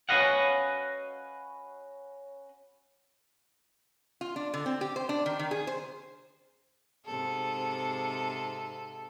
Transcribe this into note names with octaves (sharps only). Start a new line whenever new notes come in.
C#4 F#4 B4 D#5 F5 F#5
F4
D4
D3
C4
G4
C5
D4
D#3
D#3
G#4
C5
G#2 C3 A4